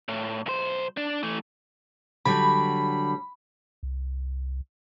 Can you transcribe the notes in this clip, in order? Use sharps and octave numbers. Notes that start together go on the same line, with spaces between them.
A2
B1 C5
D4
E3 A3
D3 F#3 G3 B5
C2